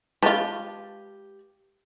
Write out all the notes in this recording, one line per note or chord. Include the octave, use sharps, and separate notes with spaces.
G#3 F4 G4 B4 A5